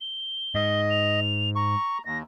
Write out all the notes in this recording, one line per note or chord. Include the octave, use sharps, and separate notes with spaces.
G7
G#2 D#5
F7
A#5 C#6
D#2 A#6